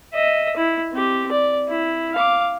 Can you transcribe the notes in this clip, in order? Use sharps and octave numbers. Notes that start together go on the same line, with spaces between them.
D#5 E5
E4
C4 G4
D5
E4
F5 D6